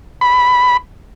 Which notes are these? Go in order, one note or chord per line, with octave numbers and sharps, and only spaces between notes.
B5